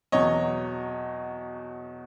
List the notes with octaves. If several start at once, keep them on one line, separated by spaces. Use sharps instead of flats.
E2 B2 F#3 C#5 D#5